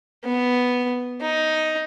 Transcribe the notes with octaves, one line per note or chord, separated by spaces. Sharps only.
B3
D#4